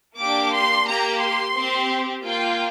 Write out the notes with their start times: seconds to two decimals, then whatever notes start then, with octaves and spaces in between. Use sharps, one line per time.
0.17 A#3 D4 G4 D6
0.52 C6
0.86 A#3 G4 A#5
1.21 C6
1.55 C4 G4
2.23 A#3 F4 G5